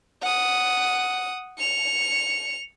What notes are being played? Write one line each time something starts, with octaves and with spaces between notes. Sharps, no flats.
F#5 D#6
C#7 F7